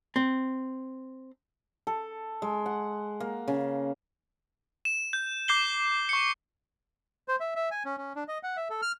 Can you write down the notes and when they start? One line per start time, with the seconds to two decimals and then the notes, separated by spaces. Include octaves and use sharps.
0.16 C4
1.87 A4
2.42 G#3
2.66 F#5
3.20 A#3
3.48 C#3
4.85 E7
5.13 G6
5.48 D6 G6 C7 E7 G7
6.09 C#6 C#7
7.28 C5
7.40 E5
7.56 E5
7.71 G#5
7.85 C#4
7.97 C#4
8.16 D4
8.28 D#5
8.43 F#5
8.57 E5
8.70 A4
8.82 F6